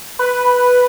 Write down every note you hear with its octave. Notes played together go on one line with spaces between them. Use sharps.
B4